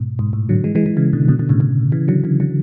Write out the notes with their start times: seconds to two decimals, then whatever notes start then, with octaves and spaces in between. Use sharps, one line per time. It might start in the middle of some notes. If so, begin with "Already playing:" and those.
Already playing: G#2 B2
0.19 G#2
0.33 A2
0.49 D3 F#3
0.64 E3 G#3
0.75 E3 G#3
0.86 E3 G#3
0.97 C#3 E3
1.13 B2 D3
1.28 B2 D3
1.39 B2 D3
1.49 A2 C#3
1.60 A2 C#3
1.92 C#3 E3
2.08 D3 F#3
2.24 C#3 E3
2.40 D3 F#3